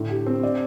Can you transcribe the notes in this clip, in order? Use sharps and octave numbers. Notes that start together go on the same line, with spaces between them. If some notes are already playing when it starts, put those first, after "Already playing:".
Already playing: A2 D3
G4
C4
D5